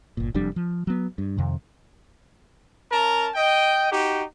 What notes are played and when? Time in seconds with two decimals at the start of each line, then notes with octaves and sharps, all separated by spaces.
0.17 G1 A#2
0.35 F1 F2 G3 D4
0.56 F3
0.87 F#3 B3
1.18 G2
1.37 F2 C3 D#3
2.90 C#4 A#4 A5 A#5
3.35 D#5 G5
3.90 D#4 F#4 G4